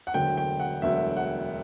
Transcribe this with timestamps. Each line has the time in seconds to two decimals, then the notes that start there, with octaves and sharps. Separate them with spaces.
0.07 F#5
0.14 E1 D2 D3 F#3 G5
0.37 G5
0.60 F#5
0.82 E1 D2 D3 F#3 E5
1.17 F#5